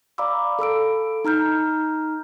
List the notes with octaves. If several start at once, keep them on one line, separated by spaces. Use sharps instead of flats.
D5 F5 A#5 B5 D6 E6
A4 B5 E6 D7
D#4 A#5 F6 G6